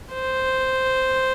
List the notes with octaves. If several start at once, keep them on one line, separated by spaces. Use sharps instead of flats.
C5